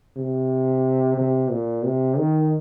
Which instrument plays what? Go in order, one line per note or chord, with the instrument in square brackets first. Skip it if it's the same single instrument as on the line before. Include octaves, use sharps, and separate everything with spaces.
[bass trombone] C3
C3
A#2
C3
D#3